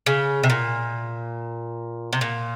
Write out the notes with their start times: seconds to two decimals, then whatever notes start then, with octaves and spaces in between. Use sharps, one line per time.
0.06 C#3
0.43 C3
0.50 A#2
2.13 C3
2.21 A#2